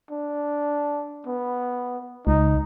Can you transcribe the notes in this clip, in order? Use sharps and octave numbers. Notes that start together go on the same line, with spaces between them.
D4
B3
C#2 D#4